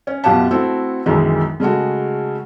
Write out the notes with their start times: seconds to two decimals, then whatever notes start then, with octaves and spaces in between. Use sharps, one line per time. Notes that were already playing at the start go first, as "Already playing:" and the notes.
0.07 C#4
0.24 F#2 B2 F4 G4 F#5 A5
0.51 A3 C4 E4 F#4 A4
1.06 B1 F#2 D#3 E3 G#3
1.60 C#3 G#3 A3 F#4